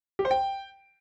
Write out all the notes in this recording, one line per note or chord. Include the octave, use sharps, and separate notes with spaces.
G4
C5
G5